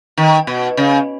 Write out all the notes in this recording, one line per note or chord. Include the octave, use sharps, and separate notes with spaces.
D#3
B2
C#3